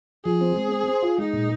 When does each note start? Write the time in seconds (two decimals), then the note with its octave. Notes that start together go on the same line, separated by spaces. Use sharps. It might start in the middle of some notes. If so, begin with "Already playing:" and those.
0.25 F3 G#4
0.41 C4
0.56 G#3
0.72 C4
0.88 C5
1.02 F4
1.18 G#3 D#4
1.33 A#2